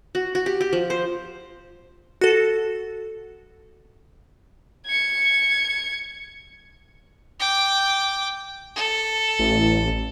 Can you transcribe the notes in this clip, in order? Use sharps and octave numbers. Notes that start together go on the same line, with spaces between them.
F#4
F#4
G4
G4
F3
C5
F#4 A4
G#6 C#7
G5 D6
A4
A1